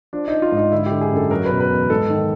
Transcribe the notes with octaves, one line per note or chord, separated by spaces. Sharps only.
F3 D4
F3 D#4
F4
G#2
D#4
D3 E4
G4
D3
G#4
F#2 A4
F#3 A#4
B4
B2
B4
E2
G#2 A4
D#3